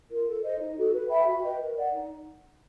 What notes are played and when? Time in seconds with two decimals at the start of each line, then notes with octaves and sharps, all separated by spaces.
0.10 F4 A#4
0.27 A4
0.43 C5 D#5
0.59 D#4
0.77 F#4 A4
0.93 B4
1.09 E5 G5 B5
1.26 F#4
1.43 B4 D#5 G5
1.60 A#4
1.77 D5 F#5
1.93 D#4